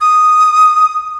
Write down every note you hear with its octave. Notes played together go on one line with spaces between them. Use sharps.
D#6